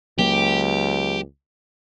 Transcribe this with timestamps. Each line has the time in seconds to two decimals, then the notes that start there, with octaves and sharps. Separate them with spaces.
0.19 C#2 F#3 A#3 G4